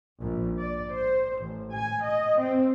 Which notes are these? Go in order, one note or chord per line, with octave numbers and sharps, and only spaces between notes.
A#1
D5
C5
A1
G#5
D#5
C4